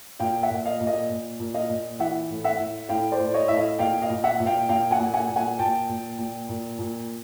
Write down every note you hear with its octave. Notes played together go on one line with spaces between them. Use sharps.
A#2 F5 G5
E5 F#5
A#2
D#5 F5
A#2
D#5 F5
A#2
A#2
D#5 F5
A#2
E3 E5 F#5
A2
E5 F#5
A2
A2 F5 G5
C5 D5
A2
C#5 D#5
A2 E5
D#5 F5
A#2 F5 G5
D#5 F5
A#2
E5 F#5
A#2
F5 G5
A#2 F5 G5
F#5 G#5
A#2
F#5 G#5
A#2
F#5 G#5
A#2 G5 A5
A#2
A#2
A#2
A#2